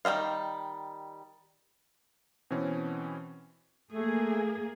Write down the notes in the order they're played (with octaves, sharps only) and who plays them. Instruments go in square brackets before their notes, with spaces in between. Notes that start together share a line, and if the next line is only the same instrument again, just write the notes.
[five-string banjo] D#3 F3 G3 F5
[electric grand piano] B2 E3 C4 C#4
[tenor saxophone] A3 [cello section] A#3 G#4